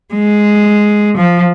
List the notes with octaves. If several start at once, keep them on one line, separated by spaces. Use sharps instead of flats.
G#3
F3